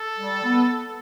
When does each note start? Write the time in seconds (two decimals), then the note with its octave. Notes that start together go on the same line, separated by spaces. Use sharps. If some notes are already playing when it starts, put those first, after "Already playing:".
Already playing: A4
0.19 G3
0.43 B3